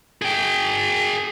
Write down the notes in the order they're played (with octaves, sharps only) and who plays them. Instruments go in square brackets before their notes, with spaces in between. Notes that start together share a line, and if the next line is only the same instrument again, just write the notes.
[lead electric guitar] G#4 G5